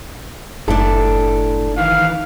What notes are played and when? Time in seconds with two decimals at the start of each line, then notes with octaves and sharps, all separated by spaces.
0.68 F#1 A2 D4 E4 A4
1.78 D#3 E3 F5